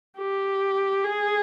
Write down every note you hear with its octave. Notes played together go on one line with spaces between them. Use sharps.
G4
G#4